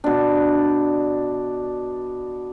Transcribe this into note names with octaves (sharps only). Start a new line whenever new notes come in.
B2 D4